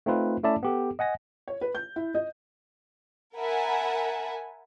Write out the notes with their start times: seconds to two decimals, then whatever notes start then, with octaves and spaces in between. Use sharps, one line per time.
0.06 A3 C4 D#4 F4 B4
0.43 A3 C#4 E4 D5 E5 A5
0.63 B3 G4 A4
0.99 D#5 F#5 G#5 A#6
1.48 C#5
1.61 B4
1.75 G6
1.96 E4
2.15 D#5
3.37 A#4 E5 F#5 G#5 A5 B5